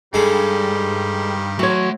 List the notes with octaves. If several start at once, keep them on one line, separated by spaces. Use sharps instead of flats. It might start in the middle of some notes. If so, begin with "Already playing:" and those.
G2 D#3 G3 G#3 A4
F#3 A3 C#5 C6